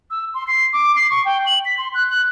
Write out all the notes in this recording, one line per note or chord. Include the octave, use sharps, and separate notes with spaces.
E6
C6
C7
D6
C7
C#6
G5
F#7
B6
C6
F#6
F#6